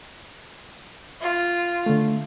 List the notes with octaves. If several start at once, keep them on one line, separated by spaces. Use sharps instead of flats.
F4
D3 A3